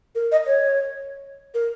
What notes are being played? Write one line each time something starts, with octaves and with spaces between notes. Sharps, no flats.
A#4
D#5
C#5
A#4